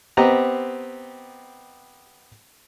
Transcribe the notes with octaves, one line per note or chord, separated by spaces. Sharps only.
B3 C4 G4 D#5 A#5